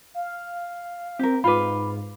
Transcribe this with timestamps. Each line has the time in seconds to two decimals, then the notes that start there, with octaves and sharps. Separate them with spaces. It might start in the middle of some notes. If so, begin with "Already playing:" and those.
0.14 F5
1.19 C4 G4 A#4
1.44 G#2 F4 B4 B5 D6